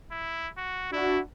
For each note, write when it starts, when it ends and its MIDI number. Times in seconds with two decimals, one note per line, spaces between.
0.11 0.48 64
0.57 0.88 66
0.92 1.19 62
0.92 1.19 64
0.92 1.19 66